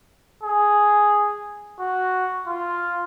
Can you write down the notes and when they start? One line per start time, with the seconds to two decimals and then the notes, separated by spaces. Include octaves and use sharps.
0.43 G#4
1.79 F#4
2.47 F4